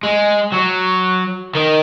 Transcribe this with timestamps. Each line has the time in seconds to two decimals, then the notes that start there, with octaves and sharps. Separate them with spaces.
0.03 G#3
0.54 F#3
1.55 D#3